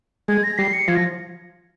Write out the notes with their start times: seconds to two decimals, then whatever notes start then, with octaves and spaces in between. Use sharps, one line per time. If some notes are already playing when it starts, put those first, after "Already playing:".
0.28 G#3 G#6
0.43 A#6
0.58 G3 C7
0.73 C#7
0.88 F3 G#6
0.95 A#6